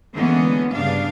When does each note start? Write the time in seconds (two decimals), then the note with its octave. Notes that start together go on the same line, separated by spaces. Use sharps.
0.14 D3 E3 G#3 A#3 B3 C#4
0.73 G2 C#3 D4 F5